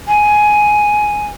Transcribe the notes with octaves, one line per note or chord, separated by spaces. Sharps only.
G#5